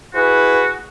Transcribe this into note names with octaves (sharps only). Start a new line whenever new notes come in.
E4 F#4 G#4 B4